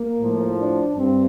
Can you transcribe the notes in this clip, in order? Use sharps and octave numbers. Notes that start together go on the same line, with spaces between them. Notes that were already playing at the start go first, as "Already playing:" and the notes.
Already playing: A#3
A2 F3
D4
G2 C4